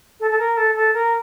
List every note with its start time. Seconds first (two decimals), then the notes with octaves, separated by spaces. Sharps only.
0.20 A4
0.30 A4
0.39 A#4
0.57 A4
0.75 A4
0.94 A#4